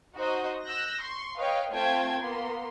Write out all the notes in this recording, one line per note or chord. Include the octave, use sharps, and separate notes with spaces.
D#4 F#4 C5 D#5
E6 F#6 G6 A#6
C6 C#6
B4 C#5 D#5 F5 G5
A3 C4 F4 G5 A5 G#6
A#3 B3 C6